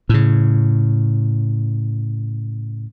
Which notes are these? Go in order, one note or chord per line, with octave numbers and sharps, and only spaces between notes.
A2 C#3